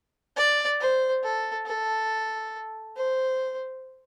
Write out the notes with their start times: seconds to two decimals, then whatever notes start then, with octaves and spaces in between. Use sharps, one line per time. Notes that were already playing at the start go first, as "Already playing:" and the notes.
0.36 D5
0.80 C5
1.23 A4
1.66 A4
2.96 C5